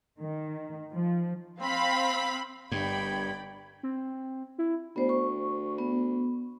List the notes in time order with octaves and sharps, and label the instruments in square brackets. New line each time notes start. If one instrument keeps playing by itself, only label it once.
[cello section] D#3
F3
[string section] C4 F5 B5
[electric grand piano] G1 [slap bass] G2 [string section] D5 G5 B5 [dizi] G#6
[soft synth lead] C4
E4
[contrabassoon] D2 [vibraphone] B3 C5
[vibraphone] C#6
B3